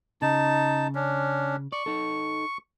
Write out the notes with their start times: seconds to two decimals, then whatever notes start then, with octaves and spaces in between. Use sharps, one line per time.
0.22 C#3 D#4 A5
0.95 C#4 D4
1.72 D5 C#6
1.86 D#4 A4